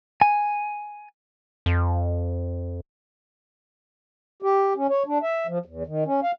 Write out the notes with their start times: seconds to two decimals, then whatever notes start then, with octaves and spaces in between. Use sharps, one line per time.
0.21 G#5
1.66 F2
4.42 G4
4.76 C#4
4.89 C#5
5.06 D4
5.23 E5
5.47 F3
5.65 E2
5.87 D#3
6.06 C#4
6.23 F5